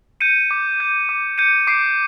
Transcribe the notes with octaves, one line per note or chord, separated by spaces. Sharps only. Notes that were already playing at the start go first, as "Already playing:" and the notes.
G6 C#7 D#7
D6
G6
D6
G6 C#7 D#7
D6 C7 D7